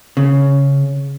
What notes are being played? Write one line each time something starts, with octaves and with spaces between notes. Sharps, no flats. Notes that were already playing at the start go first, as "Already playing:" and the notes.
C#3